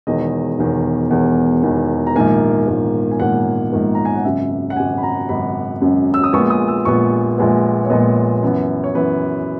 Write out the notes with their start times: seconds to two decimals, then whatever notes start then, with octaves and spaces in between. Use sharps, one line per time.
0.07 E1 E2 D#3 D#5
0.59 E1 E2 D#3
1.10 E1 E2 D#3
1.63 E1 E2 D#3
2.07 A#5
2.16 A#1 G#2 D#3 A#3 G#5
2.68 A#1 G#2 D#3 A#3
3.11 G#5
3.20 A#1 G#2 D#3 A#3 F#5
3.73 A#1 G#2 D#3 A#3
3.95 A#5
4.05 G#5
4.15 F#5
4.25 G#1 F#2 C#3 E5
4.70 F#5
4.76 G#1 F#2 C#3 G#5
4.98 B5
5.03 A#5
5.29 G#1 F#2 C#3 B5
5.81 G#1 F#2 C#3
6.14 E6
6.24 D#6
6.33 A#1 A#2 G#3 B3 C#6
6.50 D#6
6.68 E6
6.85 A#1 A#2 G#3 B3 C#6
7.38 A#1 A#2 G#3 B3
7.85 C#5
7.90 A#1 A#2 G#3 B3 D#5
8.43 F#2 E3 B3
8.84 C#5
8.94 F#2 E3 B3 B4